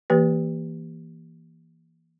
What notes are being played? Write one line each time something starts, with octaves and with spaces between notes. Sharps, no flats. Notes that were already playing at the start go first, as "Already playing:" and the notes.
E3 A#3 G4 B4